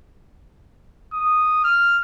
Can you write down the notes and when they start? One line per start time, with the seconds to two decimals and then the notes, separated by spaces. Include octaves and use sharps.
1.14 D#6
1.64 F6